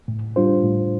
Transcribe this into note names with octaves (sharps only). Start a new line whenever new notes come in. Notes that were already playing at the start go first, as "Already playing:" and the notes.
A2
G3 D4 F4 C5
A2